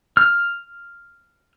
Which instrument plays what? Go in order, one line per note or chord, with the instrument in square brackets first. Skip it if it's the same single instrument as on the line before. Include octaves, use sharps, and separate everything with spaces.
[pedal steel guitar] F6